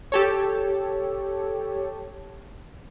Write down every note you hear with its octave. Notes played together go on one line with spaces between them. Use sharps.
G4 A4 C#5